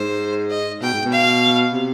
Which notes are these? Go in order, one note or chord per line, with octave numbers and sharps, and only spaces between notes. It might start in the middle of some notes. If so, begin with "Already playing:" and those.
Already playing: G#2 C5
D#5
B2 G5
G#2
B2
F5
C3